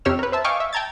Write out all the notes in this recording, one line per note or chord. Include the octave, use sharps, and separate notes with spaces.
F2 C3 G4 C#5 E6 F6
A#4 B4
C5 E5 A5
D#5 F5 G5 G#5 C#6 D6
E5
G5 A5 A#5 G#6 A6